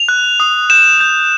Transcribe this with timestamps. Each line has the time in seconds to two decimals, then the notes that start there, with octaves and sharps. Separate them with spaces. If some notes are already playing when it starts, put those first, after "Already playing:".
Already playing: F7
0.08 F#6
0.40 D#6
0.70 G6 E7
1.01 G6